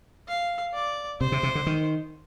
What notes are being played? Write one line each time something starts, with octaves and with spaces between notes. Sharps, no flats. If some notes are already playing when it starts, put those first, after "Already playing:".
F5
D5
C3 C5
C3
C3
D3
D#3